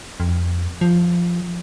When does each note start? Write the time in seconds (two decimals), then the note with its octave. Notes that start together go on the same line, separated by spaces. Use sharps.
0.20 F2
0.81 F3